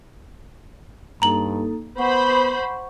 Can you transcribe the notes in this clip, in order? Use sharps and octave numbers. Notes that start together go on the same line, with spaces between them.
G2 A#3 D#4 A4 A#5 F#7
B3 C5 F#5 B5 C#6